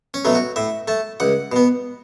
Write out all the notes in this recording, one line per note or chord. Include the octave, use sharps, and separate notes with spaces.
C#4
B2 F#3 A3
F#4
A2 E5
A3 A5
C#2 F#5
B2 B3